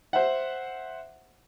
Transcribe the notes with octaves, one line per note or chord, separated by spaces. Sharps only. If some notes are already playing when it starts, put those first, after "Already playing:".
C5 E5 F#5